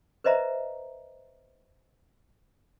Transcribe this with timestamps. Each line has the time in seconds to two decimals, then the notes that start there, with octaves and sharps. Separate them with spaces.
0.24 B4 C5 D#5 E5 A#5